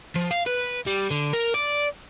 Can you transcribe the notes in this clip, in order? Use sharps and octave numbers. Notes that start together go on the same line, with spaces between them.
F3
F5
B4
G3
D3
A#4
D5